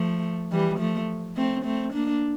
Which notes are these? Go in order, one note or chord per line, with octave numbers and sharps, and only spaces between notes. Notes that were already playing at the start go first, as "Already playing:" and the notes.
Already playing: F3 A3
E3 G3
F3 A3
A3 C4
A3 C4
A#3 D4